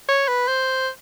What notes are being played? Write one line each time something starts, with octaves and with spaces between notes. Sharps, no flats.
C#5
B4
C5